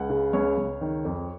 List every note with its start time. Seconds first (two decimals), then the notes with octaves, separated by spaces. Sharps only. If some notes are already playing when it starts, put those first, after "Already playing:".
Already playing: C#2 F#5
0.10 C#3
0.33 C#2 C#5
0.58 C#2
0.81 D#3
1.05 F2